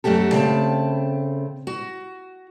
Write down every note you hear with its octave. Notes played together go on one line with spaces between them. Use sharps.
F#2 A3 F#4 G4 A4
C#3 A3 C4 D#5 G5 A5
F#4